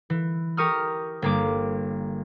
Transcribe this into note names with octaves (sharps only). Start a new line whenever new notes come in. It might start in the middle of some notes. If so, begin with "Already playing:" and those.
E3
G4 A#4 C#6 D#6 F6
G1 A#3 D6